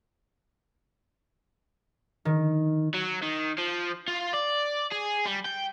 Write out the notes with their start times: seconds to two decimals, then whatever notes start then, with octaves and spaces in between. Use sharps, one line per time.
2.25 D#3
2.94 F#3
3.23 D#3
3.58 F3
4.08 F4
4.33 D5
4.92 G#4
5.25 G3
5.45 G5